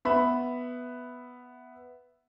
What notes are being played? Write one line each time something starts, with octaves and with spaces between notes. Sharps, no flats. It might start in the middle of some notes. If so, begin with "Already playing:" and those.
B3 E5 B5